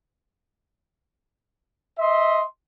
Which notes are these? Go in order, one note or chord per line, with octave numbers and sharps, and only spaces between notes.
D#5 E5 C6